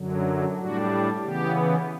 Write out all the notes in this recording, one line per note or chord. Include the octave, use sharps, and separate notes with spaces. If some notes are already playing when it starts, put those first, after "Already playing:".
Already playing: F#2 D3 F#3
A2 G3 D4 F#4
C#3 E3 B3 G4